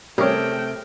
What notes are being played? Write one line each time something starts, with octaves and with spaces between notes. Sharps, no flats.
C3 G3 A3 C#4 G4 G#4 A#4 G5